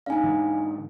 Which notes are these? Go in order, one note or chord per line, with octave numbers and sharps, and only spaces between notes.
D4 D#4 F5 G#5
G#2 D3 E3